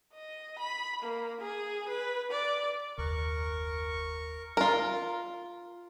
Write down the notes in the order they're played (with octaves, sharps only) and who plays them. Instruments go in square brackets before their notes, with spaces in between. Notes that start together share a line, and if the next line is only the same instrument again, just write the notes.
[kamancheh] D#5
B5
A#3
G#4
B4
D5
[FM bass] F#1 [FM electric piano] D#2 F#6 [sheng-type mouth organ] A#4 C#6
[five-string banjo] F4 A#4